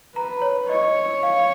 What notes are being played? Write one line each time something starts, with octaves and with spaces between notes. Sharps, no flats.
B4 A#5
C#5
C#5 D#5
F5